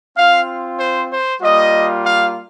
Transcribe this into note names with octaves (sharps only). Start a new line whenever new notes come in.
C4 F4 F5
C5
C5
G3 A#3 F4 D#5
F5